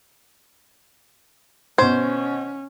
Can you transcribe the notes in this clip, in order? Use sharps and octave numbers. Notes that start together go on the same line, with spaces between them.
B2 C#4 C5 G#6